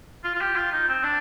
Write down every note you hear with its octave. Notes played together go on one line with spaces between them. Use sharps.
F4
F4
G4
F4
D#4
C4
D4